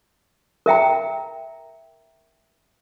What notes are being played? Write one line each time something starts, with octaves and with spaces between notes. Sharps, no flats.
A#4 E5 G5 A#5